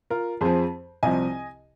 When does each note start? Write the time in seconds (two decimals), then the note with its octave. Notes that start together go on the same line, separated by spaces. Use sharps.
0.10 F4 A#4
0.41 F2 F3 G#4 C5
1.03 C2 C3 F3 D#5 G#5